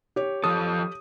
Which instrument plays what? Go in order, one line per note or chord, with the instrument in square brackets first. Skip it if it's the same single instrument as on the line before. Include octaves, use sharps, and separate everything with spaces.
[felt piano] G4 C#5
[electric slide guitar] F3 A4 [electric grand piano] D#6